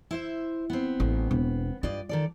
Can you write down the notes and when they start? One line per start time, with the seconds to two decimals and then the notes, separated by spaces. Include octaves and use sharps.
0.11 E4 C5 E5
0.70 B3 C4
1.00 A1
1.31 E1
1.83 G2 F4 D5 D#5
2.09 D#3 A4 D5